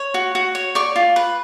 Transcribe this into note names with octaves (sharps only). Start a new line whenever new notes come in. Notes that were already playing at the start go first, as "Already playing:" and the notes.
Already playing: C#5
F#4
F#4
C#5
D5 C#6
F4
B4